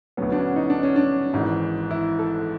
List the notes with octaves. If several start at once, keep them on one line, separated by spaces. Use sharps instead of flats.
D2 D3 F#3 B3
D4
C#4
D#4
D4
C#4
D4
G#1 G#2 E3
E4
A4